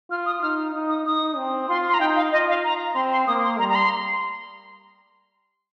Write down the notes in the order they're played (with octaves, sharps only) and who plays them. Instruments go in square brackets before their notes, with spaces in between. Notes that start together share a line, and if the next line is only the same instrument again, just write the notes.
[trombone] F4 [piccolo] F6
[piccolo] D#6
[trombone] D#4 [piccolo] F6
[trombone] D#4
[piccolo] D#6
[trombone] D#4 [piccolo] D#6
[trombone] C4
[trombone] F4 [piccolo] C6
[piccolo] C6
A#5
[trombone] D#4 [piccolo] G5
[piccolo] F5
[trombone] F4 [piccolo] D#5
[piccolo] F5
A#5
[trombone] C4 [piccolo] C6
[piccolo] C6
[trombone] A#3 [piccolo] D#6
[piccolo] C6
[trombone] G3 [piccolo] A#5
[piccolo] A#5
C6